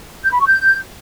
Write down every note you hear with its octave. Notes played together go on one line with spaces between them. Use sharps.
G6
B5
C#6
G6